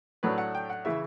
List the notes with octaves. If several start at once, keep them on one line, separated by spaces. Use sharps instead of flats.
A2 F#3 A3 D4 B4
F#5
G5
F#5
C#3 E3 E5